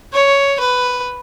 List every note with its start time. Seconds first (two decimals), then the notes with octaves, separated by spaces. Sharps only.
0.13 C#5
0.60 B4